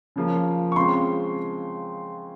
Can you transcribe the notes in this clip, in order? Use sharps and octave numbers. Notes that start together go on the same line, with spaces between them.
C#3 F3 A#3 F4
C#6
C#3 G#3 C4 F4 C6